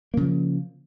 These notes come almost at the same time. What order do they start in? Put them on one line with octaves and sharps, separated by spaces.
A#3 C#3 F3